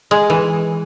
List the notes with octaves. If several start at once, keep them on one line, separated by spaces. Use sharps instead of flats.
G#3
E3